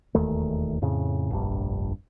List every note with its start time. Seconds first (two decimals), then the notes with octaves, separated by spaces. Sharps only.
0.15 E1 D#2 D#3 A3
0.82 F2 A2 C#3
1.30 F1 A#1 G2